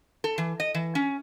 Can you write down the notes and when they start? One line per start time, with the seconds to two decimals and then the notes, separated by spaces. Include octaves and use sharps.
0.24 A4
0.38 E3
0.60 D#5
0.74 E3
0.95 C#4